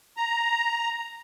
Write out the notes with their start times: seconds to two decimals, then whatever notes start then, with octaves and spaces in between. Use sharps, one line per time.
0.17 A#5